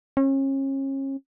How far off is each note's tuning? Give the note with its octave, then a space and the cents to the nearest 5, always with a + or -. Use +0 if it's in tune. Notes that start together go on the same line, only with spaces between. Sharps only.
C#4 -35